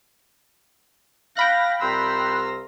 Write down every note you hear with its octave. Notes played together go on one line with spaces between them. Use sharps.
F5 G5 B5 F#6 A#6
C2 F4 A#5 C6 E6